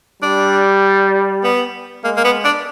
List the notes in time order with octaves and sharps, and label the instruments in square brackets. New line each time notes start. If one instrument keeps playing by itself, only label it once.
[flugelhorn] G3 [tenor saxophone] D4
[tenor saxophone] B3
[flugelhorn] G#3 [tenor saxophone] A#3
[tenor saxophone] A#3
B3
D4